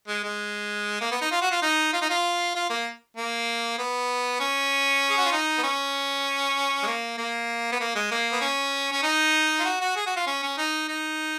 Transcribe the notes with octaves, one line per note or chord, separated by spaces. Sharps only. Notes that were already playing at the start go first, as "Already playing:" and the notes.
G#3
G#3
A#3
B3
D#4
F4
F#4
F4
D#4
F4
D#4
F4
F4
A#3
A#3
B3
C#4
G#4
F#4
F4
D#4
B3
C#4
G#3
A#3
A#3
B3
A#3
G#3
A#3
B3
C#4
C#4
D#4
F4
F#4
F#4
G#4
F#4
F4
C#4
C#4
D#4
D#4